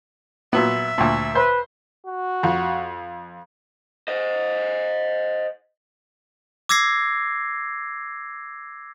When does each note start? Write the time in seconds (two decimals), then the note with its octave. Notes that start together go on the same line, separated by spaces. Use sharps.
0.53 A#2 F#3 B3 E5
0.98 D2 A#2
1.35 B4 C5
2.06 F#4
2.43 F2
4.08 C5 D#5
6.69 D6 E6 G#6 A#6 C7